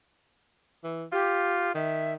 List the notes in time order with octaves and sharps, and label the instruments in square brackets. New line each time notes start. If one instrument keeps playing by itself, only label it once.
[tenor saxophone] E3
[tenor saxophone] F4 [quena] G4
[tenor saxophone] D#3 [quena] E5